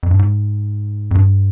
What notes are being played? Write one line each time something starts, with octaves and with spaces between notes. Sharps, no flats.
F2
G2
G#2
F2
G2